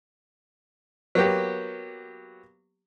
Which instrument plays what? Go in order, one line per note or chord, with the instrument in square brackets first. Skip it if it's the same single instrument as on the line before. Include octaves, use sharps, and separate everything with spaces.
[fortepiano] F#3 A#3 B3 G4